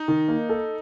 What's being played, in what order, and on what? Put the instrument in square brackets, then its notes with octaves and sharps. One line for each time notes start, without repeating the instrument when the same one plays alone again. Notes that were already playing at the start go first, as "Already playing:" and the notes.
Already playing: [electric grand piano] D#4
[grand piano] D#3
A#3
A4